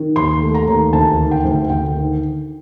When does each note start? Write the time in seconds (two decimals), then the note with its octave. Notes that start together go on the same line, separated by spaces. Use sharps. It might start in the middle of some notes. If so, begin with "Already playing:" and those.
Already playing: D#3
0.16 D#2 C6
0.42 A3
0.55 A#5
0.67 D#2
0.93 D2 A5
1.19 D#3
1.31 G5
1.44 D2
1.69 D2 G5
1.95 D#3